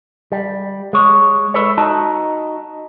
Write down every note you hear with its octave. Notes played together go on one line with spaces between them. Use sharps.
G3
G#3 C#5
E4 A4 B4 C#5
D#4 F#4 D#5 A5